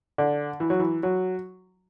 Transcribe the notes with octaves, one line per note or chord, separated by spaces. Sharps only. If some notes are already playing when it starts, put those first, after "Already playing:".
D3
E3
F#3
E3
F#3